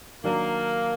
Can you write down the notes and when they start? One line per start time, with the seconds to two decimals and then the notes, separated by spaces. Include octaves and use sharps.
0.24 D#3 F#3 A#3 D4